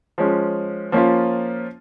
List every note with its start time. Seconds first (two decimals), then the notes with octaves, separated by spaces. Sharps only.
0.18 F3 G#3 C#4
0.92 F3 A#3 C#4 F4